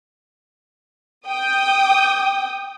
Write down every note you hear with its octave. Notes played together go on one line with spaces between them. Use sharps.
G5 D#6